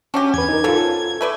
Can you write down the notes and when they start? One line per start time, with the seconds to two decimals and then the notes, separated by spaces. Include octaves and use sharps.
0.14 C#4 D4 F#4 G4
0.34 E2 B4 G#6
0.49 D#4 A#4
0.64 C#3 F3 F#3 F4 A4
1.21 A3 B4 D5